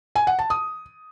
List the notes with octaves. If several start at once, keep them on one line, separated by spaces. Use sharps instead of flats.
G#5
F#5
A5
D#6